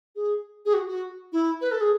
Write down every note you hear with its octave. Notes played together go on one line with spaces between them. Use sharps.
G#4
G#4
F#4
F#4
E4
B4
A4
G#4